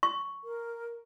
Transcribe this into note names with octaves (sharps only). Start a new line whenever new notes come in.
C#6
A#4